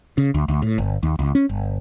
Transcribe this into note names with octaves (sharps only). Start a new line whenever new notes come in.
C#3
D2
D2
A2
G1
D#2
C#2
C#4
G1